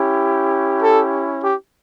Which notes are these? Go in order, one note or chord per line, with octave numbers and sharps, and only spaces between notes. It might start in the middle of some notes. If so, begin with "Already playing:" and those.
Already playing: C#4 E4 G4
A4
G4